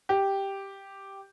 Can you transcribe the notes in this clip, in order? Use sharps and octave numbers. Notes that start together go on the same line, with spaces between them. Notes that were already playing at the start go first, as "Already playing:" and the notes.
G4